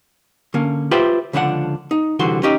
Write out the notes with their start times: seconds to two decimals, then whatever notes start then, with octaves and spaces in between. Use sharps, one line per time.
0.54 D3 A#3 C#4
0.91 F4 G4 B4 C5 E5 G5
1.33 C#2 D3 F3 D4 G#4 F#5
1.91 D#4
2.19 C2 D3 E3 F#4 C5 C6
2.43 C#4 D#4 G4 D#5